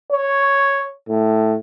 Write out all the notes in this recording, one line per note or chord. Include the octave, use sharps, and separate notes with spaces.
C#5
A2